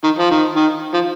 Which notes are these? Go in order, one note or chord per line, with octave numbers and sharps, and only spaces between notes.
D#3
F3
D#3
D#3
F3